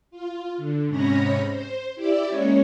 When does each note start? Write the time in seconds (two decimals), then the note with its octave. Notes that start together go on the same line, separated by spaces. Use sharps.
0.11 F4
0.57 D3
0.87 G#2 C3 C#4 C#5 B5 A#6
1.49 C5
1.95 E4 G4 D5 E5
2.28 G#3 A#3 C#4 C#5